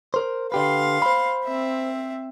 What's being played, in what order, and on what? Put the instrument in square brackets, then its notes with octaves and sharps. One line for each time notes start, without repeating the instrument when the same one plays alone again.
[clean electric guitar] A#4 C5
[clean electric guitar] D3 G4 B4 [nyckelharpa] F5 C6
[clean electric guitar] C5 B5
[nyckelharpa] C4 E5